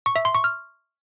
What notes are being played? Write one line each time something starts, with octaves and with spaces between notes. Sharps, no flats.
C#6
E5
C6
C#6
F6